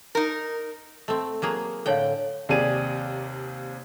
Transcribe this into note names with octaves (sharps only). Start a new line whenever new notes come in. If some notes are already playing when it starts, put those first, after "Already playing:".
D#4 A#4
A3 C4
F#3 A#3 G#4
A2 D3 A4 C#5 F5 G5
D#2 C3 G4 G#4 D5 D#7